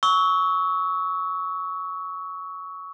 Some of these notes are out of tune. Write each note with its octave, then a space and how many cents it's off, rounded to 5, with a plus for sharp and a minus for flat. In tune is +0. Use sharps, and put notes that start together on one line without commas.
C#6 +15 E6 -30